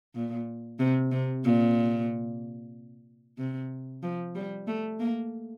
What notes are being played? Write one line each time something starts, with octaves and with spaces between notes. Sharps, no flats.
A#2
C3
C3
A#2
C3
F3
G3
A3
A#3